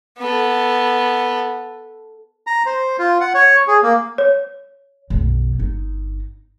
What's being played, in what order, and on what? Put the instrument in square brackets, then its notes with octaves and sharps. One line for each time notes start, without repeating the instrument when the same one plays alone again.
[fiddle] B3 A4
[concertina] A#5
C5
F4
F#5
C#5
G#4
A#3
[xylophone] C#5
[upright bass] B1 F#2
G1 D#4